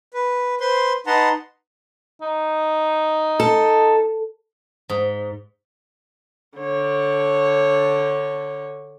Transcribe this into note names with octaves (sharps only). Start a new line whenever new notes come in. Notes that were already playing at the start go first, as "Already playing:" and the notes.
B4
B4 C5 C6
D#4 B4 F#5 A5 A#5 C6
D#4
A4
G#2
D3 C#5